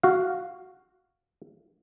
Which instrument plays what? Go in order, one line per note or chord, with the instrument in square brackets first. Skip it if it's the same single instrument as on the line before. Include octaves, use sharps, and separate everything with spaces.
[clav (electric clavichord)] F#4 F5